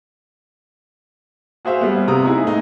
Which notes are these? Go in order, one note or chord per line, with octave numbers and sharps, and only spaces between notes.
F#4 G#4 C5 E5 F5
G3 B3
C3 A#5 D#6
D#4 E4 G#4
A2 D#4